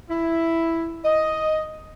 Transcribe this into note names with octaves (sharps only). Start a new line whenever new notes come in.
E4
D#5